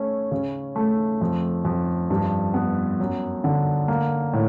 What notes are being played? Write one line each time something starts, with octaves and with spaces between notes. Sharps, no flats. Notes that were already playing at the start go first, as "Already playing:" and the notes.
Already playing: A3 C#4
C#3
A3
F2
F2
G2
B3
F#2
D3
A#3
A2